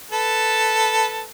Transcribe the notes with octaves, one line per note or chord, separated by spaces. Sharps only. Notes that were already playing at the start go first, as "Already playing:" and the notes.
A4 B4 A5